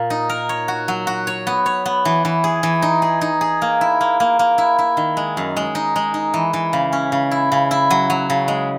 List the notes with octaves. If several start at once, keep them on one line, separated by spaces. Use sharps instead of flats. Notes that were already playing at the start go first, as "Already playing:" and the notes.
Already playing: A#2 A#3
D#4
A#4
C#5
F#4
F#3
F#4
C#5
B3
C#5
B3
E3
E3
G#4
E3
D#4
G#4
D#4
G#4
A#3
E4
A#3
A#3
A#3
E4
E4
D#3
G#3
F#2
G#3
D#4
G#3
D#4
E3
E3
C#3
C#4
C#3
E4
C#3
E4
F#3
F#3
C#3
G#3